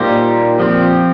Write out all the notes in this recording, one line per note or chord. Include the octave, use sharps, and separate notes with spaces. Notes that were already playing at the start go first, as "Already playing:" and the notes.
Already playing: A#2 G3 A#3 D#4 G4 C5
F3 C4 G4